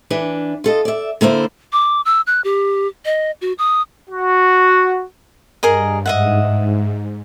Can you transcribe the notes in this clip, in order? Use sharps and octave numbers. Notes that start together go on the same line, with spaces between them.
E3 D4 B4
F4 A4 D#5
D5 E5
D3 A#3 E4 C5
D6
E6
F#6
G4
D#5
F#4
D#6
F#4
G2 G#4 A#4 D#5
G#2 D#5 E5 F#5